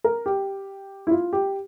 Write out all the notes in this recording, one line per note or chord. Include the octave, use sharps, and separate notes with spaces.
A#4
G4
E4
F4
G4